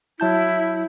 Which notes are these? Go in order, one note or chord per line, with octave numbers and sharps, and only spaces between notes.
F#3 E4 A5 G6